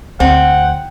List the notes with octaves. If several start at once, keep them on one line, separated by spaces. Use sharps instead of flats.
D2 C4 F#5